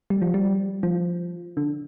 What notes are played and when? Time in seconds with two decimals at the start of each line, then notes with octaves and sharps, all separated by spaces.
0.10 G3
0.22 F3
0.34 G3
0.83 F3
1.57 D3